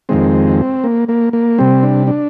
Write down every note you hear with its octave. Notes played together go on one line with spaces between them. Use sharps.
F2 D#3 G#3 C4
A#3
A#3
A#3
C3 G3 C4
D4
D4